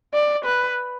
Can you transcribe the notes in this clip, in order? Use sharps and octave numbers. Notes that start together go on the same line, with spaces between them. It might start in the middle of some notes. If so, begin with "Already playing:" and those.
D5
B4